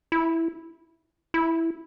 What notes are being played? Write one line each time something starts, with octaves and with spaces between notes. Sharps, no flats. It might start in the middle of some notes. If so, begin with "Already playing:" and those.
E4
E4